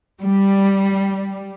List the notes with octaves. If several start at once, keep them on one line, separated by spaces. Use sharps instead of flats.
G3